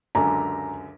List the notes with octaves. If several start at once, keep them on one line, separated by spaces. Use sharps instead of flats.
C#2 F#2 D3 A#5